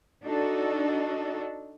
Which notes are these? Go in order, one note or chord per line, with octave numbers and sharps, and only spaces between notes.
D4 D#4 F#4 A4